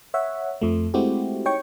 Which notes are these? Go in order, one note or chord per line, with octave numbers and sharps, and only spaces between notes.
C#5 E5 F#5
F2 F3 A3
G#3 A3 C4 E4 F#4 G4
D#4 C#5 G5 C#6